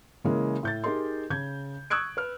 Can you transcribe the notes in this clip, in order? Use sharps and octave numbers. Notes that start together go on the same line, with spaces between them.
C#3 E3 G#3 A#3
A2 G6 A6
D#4 G4 G#4 A#4 D#5 C6
C#3 G6 G#6
C#6 D#6 E6 F#6 G#6 D7
B4 F6